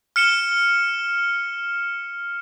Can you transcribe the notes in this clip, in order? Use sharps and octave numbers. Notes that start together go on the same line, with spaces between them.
F6 C#7 E7 G7